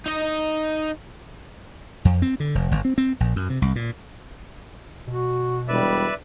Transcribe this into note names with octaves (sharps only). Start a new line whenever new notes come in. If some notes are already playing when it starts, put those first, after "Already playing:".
D#4 D#5
F2
C4
D3
F1
G1
C4
C4
A#1
F#2
C3
C2
A#2
B2 F#4
E1 G3 B4 D5 E5